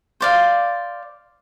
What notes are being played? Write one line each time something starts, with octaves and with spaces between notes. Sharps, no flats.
C5 D5 F5